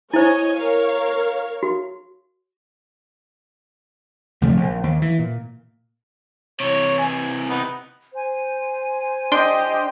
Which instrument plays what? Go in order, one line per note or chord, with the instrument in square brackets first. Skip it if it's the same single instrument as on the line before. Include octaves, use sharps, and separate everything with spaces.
[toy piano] E4 C5 [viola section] C#5 D#5 G#5
[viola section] A#4 C#5 F5
[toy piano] F#4
[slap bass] D2 C3 F3 A3
A#1
D#2
E3
A#2
[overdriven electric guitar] C3 E3 [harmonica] C#5
[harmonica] G#5
B3 D#4
[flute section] C5 G#5
[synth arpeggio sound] D4 G5 C6 [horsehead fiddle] G4 D#5